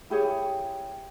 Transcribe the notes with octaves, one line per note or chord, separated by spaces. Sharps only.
E4 G4 G#4 C#5